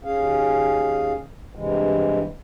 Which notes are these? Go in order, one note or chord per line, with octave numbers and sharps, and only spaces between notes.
D#2 C#4 G#4 F5
G2 C3 E3 G#3